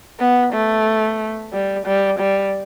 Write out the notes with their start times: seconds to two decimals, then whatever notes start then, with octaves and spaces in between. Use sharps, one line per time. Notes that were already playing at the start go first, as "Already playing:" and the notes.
0.20 B3
0.53 A3
1.53 G3
1.87 G3
2.20 G3